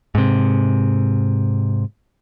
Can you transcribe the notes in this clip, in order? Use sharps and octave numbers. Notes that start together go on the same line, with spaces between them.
G#2 C3